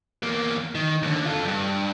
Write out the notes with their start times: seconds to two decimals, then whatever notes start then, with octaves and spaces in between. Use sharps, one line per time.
0.23 E2 A#3
0.75 D#3
1.02 D#2 D3
1.25 F4 A4
1.44 E2 G2